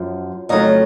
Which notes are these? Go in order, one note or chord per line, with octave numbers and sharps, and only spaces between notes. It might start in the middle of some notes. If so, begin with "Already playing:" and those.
Already playing: F#2 F3
F2 C#3 F#3 A3 D#4 D#5